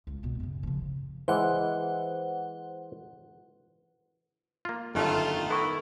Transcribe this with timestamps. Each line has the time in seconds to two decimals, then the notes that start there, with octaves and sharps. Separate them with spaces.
0.07 C#2
0.23 B2 B3
0.40 F#2 C#3
0.63 C#3 F3
1.28 E3 G#3 C5 F#5
4.65 A#3 F4
4.95 G1 F#2 D#3 A3 F4
5.50 B3 E4 A4 E5 C#6